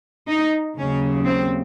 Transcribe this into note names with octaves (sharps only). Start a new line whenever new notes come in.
D#4
D#2 C#3 F#3 C#4
C4